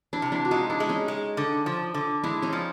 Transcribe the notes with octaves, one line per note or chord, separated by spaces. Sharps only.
D4 E4
C3
D4 E4
F#4
G#3 D#4 F4
D4 E4
G#3
C#4 D#4
G#3
D3
F3
D3
G#3 D4 E4
C#4 D#4
F3